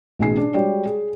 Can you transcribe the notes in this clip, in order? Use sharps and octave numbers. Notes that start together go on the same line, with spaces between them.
A1 B2 D#4 G#4 G#5 C7
D4
G3 G#3 F#4 C#5 D5 G5
G#4